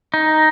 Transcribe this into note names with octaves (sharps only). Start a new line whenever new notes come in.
D#4